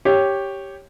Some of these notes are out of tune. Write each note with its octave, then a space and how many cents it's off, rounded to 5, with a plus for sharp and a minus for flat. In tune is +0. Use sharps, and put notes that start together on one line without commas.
G4 +0 C#5 -5